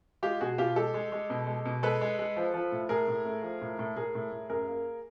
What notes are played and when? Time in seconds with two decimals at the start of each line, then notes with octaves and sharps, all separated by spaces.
0.23 G#3 F4 G4
0.41 B2 F#4 G#4
0.58 B2 F4 G4
0.76 G#3 G4 A4
0.94 G#3
1.12 G#3
1.30 B2
1.47 G#3
1.65 B2
1.83 G#3 A4 B4
2.01 G#3
2.19 G#3
2.36 F3
2.54 F3
2.72 A2
2.89 A2 G#4 A#4
3.08 A2
3.26 A3
3.43 F3
3.61 A2
3.79 A2
3.96 A2 G#4 A#4
4.15 A2
4.32 A2
4.50 F#2 G#4 A#4
4.68 A#3